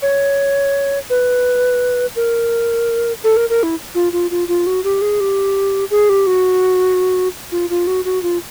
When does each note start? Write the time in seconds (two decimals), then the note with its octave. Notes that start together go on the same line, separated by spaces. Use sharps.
0.02 C#5
1.10 B4
2.16 A#4
3.24 A4
3.37 A#4
3.50 A#4
3.63 E4
3.95 F4
4.13 F4
4.31 F4
4.48 F4
4.67 F#4
4.84 G4
5.02 G#4
5.20 G4
5.91 G#4
6.09 G4
6.27 F#4
7.52 F4
7.70 F4
7.87 F#4
8.05 F#4
8.23 F4